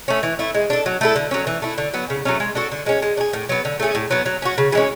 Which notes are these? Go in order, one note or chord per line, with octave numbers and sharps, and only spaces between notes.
A3 C#4
E3
A3 E4
G#3
D4 A4
F#3
A3 E4 A4
D3
F#3 C#4
E3
A3 E4
D3
F#3 B3
C#3
F#3 A3 C#4
G#3
D4 F#4 A4
D3
G#3 C#4
G#3
D4
G#4
A2
F#3 B3
D3
A3 C#4 G#4
A2
F#3 B3
F#3
C#4 F#4
C#3
E3 G#3 C#4